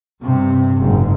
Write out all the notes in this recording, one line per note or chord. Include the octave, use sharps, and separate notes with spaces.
G2 C3
F#1 G#2